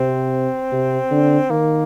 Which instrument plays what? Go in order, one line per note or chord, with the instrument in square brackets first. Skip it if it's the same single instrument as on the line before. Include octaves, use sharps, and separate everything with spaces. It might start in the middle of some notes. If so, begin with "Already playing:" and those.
Already playing: [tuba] C3 [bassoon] C4
[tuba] C3
D3
[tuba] D#3 [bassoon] A#3